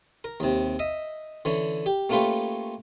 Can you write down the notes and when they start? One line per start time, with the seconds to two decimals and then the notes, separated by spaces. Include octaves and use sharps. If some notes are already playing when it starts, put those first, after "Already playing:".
0.24 A#4
0.40 D#2 C3
0.79 D#5 E5
1.45 D3 E3 C#4
1.86 G4
2.10 A3 A#3 C#4 F4 G4 B4